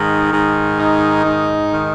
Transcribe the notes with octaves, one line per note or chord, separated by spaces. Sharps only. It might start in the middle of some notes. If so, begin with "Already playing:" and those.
Already playing: G#2 D#3
G#2
D#3 D#4
G#2
D#3